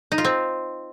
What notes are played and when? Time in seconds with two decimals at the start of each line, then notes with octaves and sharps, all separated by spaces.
0.12 D#4
0.18 F4
0.25 C4